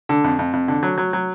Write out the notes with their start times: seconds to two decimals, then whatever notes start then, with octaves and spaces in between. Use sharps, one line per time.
0.09 D3
0.24 F2
0.39 F2
0.53 F2
0.68 D3
0.83 F#3
0.98 F#3
1.13 F#3